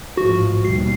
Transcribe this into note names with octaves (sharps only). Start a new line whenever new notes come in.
A1 G#2 F3 F#4
D#2 B2 G3 C7